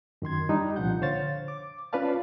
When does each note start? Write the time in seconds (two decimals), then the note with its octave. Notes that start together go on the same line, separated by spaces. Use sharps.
0.22 F#2 D#3 C6 G#6
0.49 G3 D4 D#4
0.76 C2 A#2 F3 F#5 G6
1.02 D3 C5 C#5 F5 A6
1.48 D6
1.93 C#4 F4 B4 D5 F5 A5